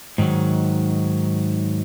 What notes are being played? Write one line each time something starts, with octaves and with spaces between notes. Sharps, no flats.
G#2 D#3 F#3